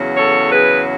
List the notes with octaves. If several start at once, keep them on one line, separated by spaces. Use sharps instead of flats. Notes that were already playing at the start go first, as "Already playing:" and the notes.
Already playing: E2 C#3 F#3
A4 C#5
G#4 B4